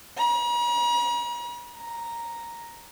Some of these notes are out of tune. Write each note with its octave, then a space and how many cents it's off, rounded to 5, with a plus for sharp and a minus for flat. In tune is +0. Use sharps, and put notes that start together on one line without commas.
A#5 +45
A#5 +0